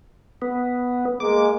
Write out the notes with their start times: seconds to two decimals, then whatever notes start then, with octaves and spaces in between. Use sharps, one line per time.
0.42 B3
1.20 G#3 A#3 D6